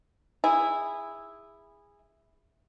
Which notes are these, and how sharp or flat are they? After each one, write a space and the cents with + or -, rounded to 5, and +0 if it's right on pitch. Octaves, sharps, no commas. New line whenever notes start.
E4 +0 G#4 -20